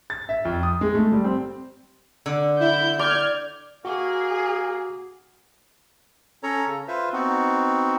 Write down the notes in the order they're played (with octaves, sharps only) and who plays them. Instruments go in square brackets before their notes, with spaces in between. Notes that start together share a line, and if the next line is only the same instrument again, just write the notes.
[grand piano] A6
E5
F2
D#6
G#3
A3
G3
C4
[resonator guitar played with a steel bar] D3
[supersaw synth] E4 [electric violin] G6
[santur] D5 [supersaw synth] F6 G#6
[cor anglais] A#3 [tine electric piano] F#4 [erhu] G#4
[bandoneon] C#4 A4 C#5 A#5
C#3
F4 B4 C5 E5
B3 C4 D#4 F#4